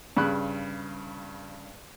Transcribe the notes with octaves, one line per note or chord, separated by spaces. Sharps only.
G2 C#3 B5 F#6